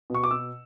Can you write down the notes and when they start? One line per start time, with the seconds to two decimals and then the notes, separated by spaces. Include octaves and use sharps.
0.10 B2 C#6
0.23 D6
0.31 B2 E6